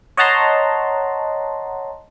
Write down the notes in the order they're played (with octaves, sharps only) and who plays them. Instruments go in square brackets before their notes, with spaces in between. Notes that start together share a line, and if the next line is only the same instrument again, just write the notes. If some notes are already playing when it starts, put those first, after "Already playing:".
[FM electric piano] C#5 D#5 F#5 A5 A#5 C6